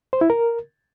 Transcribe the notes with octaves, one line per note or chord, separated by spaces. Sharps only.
C5
E4
A#4